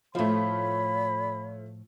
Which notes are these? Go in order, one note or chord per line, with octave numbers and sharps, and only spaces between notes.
A2 F3 A3 F4 C#5 B5